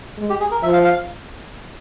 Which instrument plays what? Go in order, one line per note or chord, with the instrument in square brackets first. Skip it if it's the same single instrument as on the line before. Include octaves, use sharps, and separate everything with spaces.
[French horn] G#3
[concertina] G4
G#4
A#4
[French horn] F3 [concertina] E5
[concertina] F5
F5